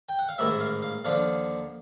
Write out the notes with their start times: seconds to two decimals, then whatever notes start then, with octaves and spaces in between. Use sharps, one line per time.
0.09 G5
0.19 F#5
0.29 F5
0.38 A1 G#2 D#3 E5
0.60 F5
0.82 F5
1.05 D#2 D3 F3 F5